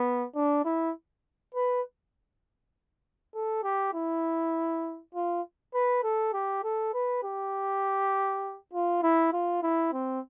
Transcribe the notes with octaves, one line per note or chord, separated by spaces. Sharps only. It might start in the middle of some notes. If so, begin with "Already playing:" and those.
Already playing: B3
D4
E4
B4
A4
G4
E4
F4
B4
A4
G4
A4
B4
G4
F4
E4
F4
E4
C4